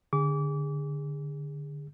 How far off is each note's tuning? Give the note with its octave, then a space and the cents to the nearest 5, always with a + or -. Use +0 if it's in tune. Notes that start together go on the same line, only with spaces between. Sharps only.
D3 +0 G#4 -25 D6 -30